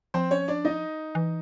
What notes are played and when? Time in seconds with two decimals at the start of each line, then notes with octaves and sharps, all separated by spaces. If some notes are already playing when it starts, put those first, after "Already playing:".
0.14 F3 C4 C5
0.31 C#4 C#5
0.48 D4 D5
0.65 D#4 D#5
1.15 E3